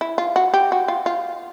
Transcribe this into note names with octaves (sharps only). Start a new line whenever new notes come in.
E4
F4
F#4
G4
F#4
F4
F4